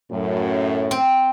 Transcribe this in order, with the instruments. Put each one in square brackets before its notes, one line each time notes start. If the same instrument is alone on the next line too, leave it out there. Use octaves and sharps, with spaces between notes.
[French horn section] F#2 A2
[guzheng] C4